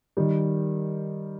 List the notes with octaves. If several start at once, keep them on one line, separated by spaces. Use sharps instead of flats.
D#3 G3